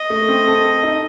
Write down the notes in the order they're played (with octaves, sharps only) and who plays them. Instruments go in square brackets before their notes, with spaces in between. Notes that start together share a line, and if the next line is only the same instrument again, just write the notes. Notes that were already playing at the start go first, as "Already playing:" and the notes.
Already playing: [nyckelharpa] D#5
[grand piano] A3
C4
A4
A4
D#4